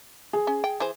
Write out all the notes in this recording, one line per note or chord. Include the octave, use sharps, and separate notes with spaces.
G#4
C#4
G5
E3 G#4 C5